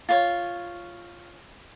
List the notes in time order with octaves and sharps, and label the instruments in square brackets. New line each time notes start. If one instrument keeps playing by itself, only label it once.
[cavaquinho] F4 C#5